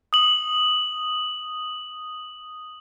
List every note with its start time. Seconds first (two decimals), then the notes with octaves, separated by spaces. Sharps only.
0.13 D#6 F#7